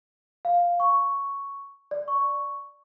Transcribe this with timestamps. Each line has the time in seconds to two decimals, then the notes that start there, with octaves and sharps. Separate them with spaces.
0.45 F5
0.80 C#6
1.91 D5
2.08 C#6